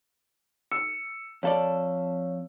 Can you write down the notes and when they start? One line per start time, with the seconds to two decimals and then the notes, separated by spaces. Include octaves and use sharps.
0.72 E6 C#7
1.43 F2 A4 C#5 D5 F5